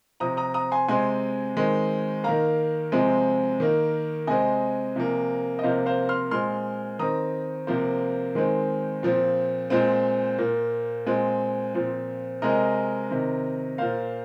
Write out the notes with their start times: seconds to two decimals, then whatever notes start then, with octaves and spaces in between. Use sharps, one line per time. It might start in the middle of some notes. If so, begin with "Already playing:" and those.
0.20 C3 F3 C4 A#5 D#6
0.37 A#5 D#6
0.54 A#5 D#6
0.71 G#5 C6
0.88 C3 G#3 C4 G#5 C6
1.57 D#3 G#3 C4
2.24 D#3 A#3 F5 A#5
2.92 C3 F3 G#3 C4
3.60 D#3 A#3
4.27 C3 G#3 C4 D#5 G#5
4.96 C3 F3 A#3
5.59 D#5
5.63 C3 F3 A#3 C5 F5
5.86 C5 F5
6.09 C6 F6
6.31 A#2 G#3 C4 C6 F6
6.99 D#3 C4 A#5 D#6
7.67 C3 F3 A#3 C5
8.35 D#3 G#3 C4
9.03 A#2 F3 C4
9.70 A#2 G#3 C4 C5
10.38 A#2 A#3
11.06 A#2 G#3 C4
11.75 A#2 F3 C4
12.42 C3 G#3 C4 A#4 D#5
13.10 C3 D#3 C4
13.78 A#2 A#3 C5 F5